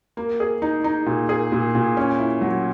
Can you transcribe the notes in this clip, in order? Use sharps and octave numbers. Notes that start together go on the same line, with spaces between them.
A#3
G#4
D#4
D#4
A#2
G#4
A#2
A#2
C#4
E4
F#3